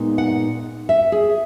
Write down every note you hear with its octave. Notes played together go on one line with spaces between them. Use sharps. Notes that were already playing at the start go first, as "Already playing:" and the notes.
Already playing: A#2 G#3 B3 D#4
F#5
E5
G#4